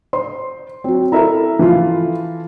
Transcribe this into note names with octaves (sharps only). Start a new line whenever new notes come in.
C5 C6
F#3 C4
E4 A4 A#4 E5 A#5
E3 F3 F4